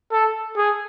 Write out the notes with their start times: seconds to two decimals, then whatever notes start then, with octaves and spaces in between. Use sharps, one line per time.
0.12 A4
0.56 G#4